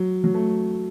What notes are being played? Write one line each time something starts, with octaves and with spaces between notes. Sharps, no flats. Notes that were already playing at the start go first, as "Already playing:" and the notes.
Already playing: F#3
F#3
A3